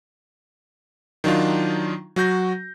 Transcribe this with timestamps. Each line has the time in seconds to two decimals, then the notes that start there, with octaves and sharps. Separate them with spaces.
1.24 D#3 F#3 D4 D#4 F4
2.16 F#3 F#4 G6 A#6